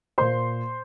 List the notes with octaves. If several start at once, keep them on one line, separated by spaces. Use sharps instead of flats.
A#2 A#3 C5 C6